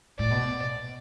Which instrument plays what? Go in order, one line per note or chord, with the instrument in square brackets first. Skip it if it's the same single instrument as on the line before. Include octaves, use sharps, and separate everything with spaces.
[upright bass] A2 [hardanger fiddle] D5
[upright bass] B2